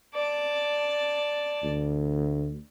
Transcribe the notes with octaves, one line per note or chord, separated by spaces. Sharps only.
D5 A5
D2